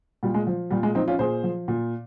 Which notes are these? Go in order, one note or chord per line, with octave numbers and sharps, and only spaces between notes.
A#2 G3
G#3
F3
A#2 G3
G#3
F3 C4 D#4
C#4 F4
A#2 G#4 C5
F3
A#2